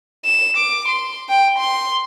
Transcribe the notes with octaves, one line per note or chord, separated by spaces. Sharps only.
E7
D6
C6
G5
C6